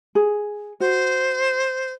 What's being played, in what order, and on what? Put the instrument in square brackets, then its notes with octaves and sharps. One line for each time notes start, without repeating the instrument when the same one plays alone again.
[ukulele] G#4
[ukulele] F#4 [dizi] C5